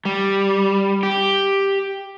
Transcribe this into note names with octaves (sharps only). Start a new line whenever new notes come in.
G3
G4